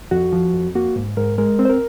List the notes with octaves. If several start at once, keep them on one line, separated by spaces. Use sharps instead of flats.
F2 F#4
F3
F2
A#3 F#4
G#2
G#2 A#4
G#3 A#4
C4
C5
A#4